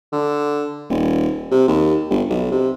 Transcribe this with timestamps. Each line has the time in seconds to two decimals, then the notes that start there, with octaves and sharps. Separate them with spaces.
0.12 D3
0.90 D#1
1.51 C3
1.68 D#2
2.10 G1
2.30 B1
2.51 C3